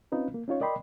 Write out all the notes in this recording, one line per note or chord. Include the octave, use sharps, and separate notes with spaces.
C4 C#4 D#4 F4 B4
A#3
C#4 D#4 F4 C#5
A#4 D5 D#5 G5 B5 C6